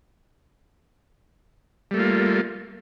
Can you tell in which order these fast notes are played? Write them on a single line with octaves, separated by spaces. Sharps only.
G3 A3 A#3 F4